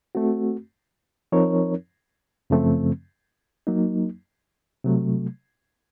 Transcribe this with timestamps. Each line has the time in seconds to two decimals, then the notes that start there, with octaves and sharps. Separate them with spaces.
0.15 A3 C4 F#4
1.32 F3 C4 D#4 A#4 C#5
2.50 F#2 C#3 F3 A3 C4
3.67 F#3 A#3 D#4
4.84 C3 F#3 A3